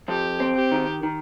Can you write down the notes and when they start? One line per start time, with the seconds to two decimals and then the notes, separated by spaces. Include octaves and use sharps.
0.08 F2 G4
0.40 C4
0.56 G4
0.72 D#3
1.03 D#3